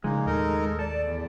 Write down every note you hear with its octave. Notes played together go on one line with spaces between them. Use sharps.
A#2 C#3 F3 G#3 A#3 D#4
D#2 A2 D#4 A4 A#4 D#5
A4 D5 A5
E2